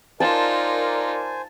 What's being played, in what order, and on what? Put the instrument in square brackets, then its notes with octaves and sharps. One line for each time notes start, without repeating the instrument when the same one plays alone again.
[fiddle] D#4 F4 [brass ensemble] A#4 D5 [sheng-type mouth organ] C5 G#5 [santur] A5